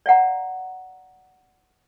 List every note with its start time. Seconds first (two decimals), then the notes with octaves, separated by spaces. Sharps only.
0.06 D5 F5 F#5 A#5